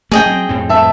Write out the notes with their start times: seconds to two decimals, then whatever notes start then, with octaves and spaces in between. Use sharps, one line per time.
0.12 A3 C#4 G#4 D#5 G5
0.26 F#3 C4
0.49 F2 A2 C4
0.69 E5 A5